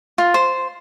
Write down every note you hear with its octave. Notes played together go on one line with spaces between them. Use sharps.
F4
C5